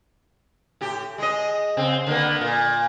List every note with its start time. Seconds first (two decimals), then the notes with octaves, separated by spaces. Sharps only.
0.81 A2 G4
1.18 G#3 D#5
1.77 C#3 C4
2.07 D3 A#3 B3
2.41 A#2